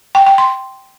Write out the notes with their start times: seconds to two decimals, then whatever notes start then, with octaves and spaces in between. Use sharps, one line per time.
0.15 G5
0.26 G5
0.38 C6